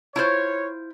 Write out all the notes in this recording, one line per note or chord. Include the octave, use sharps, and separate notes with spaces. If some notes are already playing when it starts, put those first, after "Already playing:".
E4 F4 C5 C#5